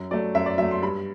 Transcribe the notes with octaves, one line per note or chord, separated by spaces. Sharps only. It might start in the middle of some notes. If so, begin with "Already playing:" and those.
Already playing: F#2
F#3 A3 D5
F#2 E5
D5
F#3 A3 E5
C6
G2 B5